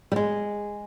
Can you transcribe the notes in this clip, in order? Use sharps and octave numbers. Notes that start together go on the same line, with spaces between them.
G3
G#3